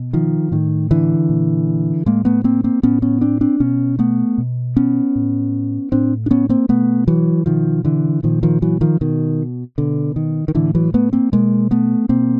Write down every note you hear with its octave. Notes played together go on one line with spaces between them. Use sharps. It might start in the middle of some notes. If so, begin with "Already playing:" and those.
Already playing: B2
D#3 F3
A2 D#3
D3 E3
A#2
A2 G#3 A#3
A3 B3
A#3 C4
A#3 C4
A2 B3 C#4
B3 C#4
C4 D4
C4 D4
B2 B3 C#4
A3 B3
B2
B3 C#4
A2
A2 C4 D4
D4
B3 C#4
A#3 C4
B2 A3 B3
E3 F#3
B2 D#3 F3
D3 E3
A#2 D#3 F3
D#3 F3
E3 F#3
D#3 F3
B2 D#3
B2 D3
D#3
D#3
A2 D3 E3
E3 F#3
A3 B3
A#3 C4
B2 G#3 A#3
A3 B3
B2 A#3 C4